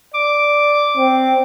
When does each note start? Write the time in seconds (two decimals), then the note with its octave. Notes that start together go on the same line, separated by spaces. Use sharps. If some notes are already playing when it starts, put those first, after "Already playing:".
0.14 D5 D6
0.97 C4